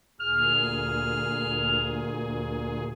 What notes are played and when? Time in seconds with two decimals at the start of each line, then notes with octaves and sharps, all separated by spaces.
0.20 D2 A#2 G#4 F6